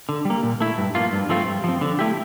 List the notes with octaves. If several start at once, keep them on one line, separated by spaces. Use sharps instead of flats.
D3
G3 A#3
A#2
A3 E4
G2
F3 A#3 F4
G2
F3 A3 C4 F4
G2
F3 C4
D3
A3 E4 G4